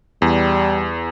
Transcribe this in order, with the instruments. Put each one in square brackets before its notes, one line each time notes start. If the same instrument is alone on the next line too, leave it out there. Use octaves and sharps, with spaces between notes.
[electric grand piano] E2 [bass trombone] G3